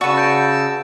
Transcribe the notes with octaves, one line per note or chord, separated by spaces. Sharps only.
C#3 F#4 B4 D5 A5 E6 A6 C#7
F#5 G6 A#6 D7